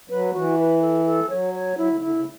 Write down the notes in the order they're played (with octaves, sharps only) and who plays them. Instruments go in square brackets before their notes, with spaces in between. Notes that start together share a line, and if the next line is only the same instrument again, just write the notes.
[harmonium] F#3 [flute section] B4
[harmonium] E3 [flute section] F#4
[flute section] B4
A4
A4
[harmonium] F#3 [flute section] C#5
[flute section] C#5
[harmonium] F#3 [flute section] E4
[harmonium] D3
[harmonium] D3 [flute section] E4
[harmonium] C#3